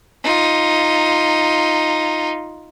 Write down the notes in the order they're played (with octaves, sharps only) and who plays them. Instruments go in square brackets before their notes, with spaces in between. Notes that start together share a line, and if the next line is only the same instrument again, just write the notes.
[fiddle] D#4 F4